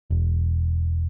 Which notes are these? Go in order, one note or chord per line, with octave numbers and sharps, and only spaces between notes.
E1